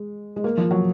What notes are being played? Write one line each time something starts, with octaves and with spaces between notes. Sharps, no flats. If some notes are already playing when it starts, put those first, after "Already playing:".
Already playing: G#3
G#3
A#3
F3
F#3